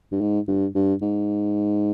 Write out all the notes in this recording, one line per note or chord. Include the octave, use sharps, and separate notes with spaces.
G2
G#2
G2
G2
G#2